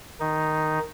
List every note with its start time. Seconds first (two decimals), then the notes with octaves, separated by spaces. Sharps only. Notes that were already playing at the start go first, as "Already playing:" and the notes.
0.20 D#3 D#4